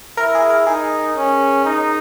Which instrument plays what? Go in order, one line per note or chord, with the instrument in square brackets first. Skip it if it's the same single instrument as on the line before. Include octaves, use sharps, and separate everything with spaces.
[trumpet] E4 [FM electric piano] A#4
[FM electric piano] G#4
A#4
[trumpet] D#4 [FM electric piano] G#4
[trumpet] C#4
D#4